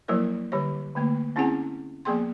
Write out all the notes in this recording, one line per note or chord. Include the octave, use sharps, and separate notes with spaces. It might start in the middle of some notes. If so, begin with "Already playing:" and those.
F3 F#3 A#3 E4 A#4 C#5
D3 G3 G4 C#5
D3 A3 A#3
C4 C#4 E4 G#4 F#5 G#5
F3 A#3 B3 G#4 G5 C6